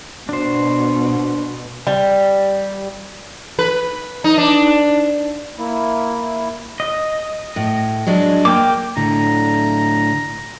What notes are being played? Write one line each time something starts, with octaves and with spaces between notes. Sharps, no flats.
B2 D4 C5
G3
B4
D#4
D4
A#3 E4
D#5
A2
F#3 G#3 D4
A#3 G5 D6
A2 D3 A#5